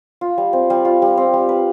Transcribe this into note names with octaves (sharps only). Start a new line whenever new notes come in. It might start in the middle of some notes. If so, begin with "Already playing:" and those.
F4
G3
C4
G3
F4
G3
C4
G3
B4